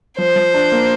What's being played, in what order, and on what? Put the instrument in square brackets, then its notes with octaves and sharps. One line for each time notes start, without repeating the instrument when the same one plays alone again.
[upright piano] F3 [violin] C5
[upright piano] F3
D4
A#3